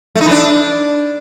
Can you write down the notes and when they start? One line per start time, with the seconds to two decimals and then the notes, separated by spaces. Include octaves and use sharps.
0.15 A3
0.21 D#4
0.26 E3
0.31 D4